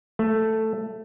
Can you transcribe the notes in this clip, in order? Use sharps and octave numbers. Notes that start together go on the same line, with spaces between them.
A3